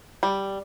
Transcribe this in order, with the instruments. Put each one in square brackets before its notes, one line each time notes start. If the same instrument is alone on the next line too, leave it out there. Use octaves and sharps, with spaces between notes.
[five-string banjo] G3